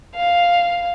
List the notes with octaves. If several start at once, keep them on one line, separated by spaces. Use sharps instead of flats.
F5